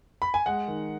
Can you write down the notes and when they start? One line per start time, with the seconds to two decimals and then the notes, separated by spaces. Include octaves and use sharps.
0.22 B5
0.34 G#5
0.46 G#3 F#5
0.68 D#3